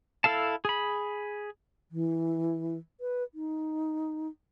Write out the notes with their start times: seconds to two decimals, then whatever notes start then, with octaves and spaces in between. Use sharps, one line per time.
0.24 E4 A4 F5 A5
0.65 G#4 B5
1.91 E3
3.01 B4
3.34 D#4